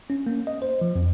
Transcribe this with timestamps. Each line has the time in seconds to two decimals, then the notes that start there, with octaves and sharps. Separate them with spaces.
0.10 C#4
0.27 A#3
0.47 D#5
0.62 C5
0.81 F3
0.96 F2